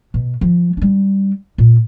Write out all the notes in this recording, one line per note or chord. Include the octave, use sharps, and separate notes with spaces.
B2
F3
G3 D4
A#2